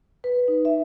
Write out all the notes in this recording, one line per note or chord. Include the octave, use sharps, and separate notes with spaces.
B4
D#4
E5